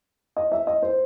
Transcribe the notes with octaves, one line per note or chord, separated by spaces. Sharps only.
D#5
E5
D#5
C5